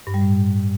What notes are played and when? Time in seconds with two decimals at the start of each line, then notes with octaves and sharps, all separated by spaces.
0.07 G2
0.14 G3
0.21 A2